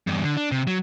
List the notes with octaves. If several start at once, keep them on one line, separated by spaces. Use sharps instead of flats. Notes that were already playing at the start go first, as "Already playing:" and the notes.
E2 G2
D3
D4
C3
F#3